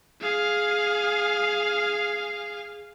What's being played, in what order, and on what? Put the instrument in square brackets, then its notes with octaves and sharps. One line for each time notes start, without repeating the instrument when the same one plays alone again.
[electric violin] G#4 F5